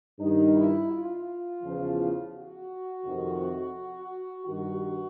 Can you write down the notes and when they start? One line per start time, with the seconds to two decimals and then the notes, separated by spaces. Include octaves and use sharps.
0.19 G2 D#3 D#4
0.55 E4
0.91 F4
1.63 E2 C#3 F3
2.35 F#4
3.05 F2 C3 D#3
4.48 G2 D#3 F#4